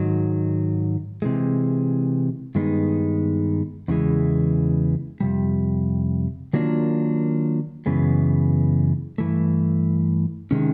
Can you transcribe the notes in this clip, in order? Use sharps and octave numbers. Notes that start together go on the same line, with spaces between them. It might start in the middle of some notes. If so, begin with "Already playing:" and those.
Already playing: G#2 D#3 F#3
C3 E3 G#3
G2 D#3 G#3 B3 D#4
E2 C#3 E3 G#3
F2 C3 G3
D#3 F#3 A#3 D4 F4
F#2 C#3 E3 G#3 B3
G2 E3 A3
C3 D#3 G#3 C#4